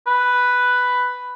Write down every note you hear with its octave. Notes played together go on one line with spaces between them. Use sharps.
B4